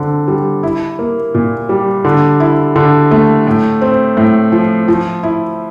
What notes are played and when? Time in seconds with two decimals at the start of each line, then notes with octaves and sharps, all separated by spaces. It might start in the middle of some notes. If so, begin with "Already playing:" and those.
Already playing: D3 C4
0.28 G3
0.63 E4
0.99 A#3
1.34 A#2
1.69 G3
2.05 D3
2.40 E4
2.76 D3
3.11 A3
3.47 A2
3.81 C4
4.17 A2
4.52 F3
4.88 F3
5.23 E4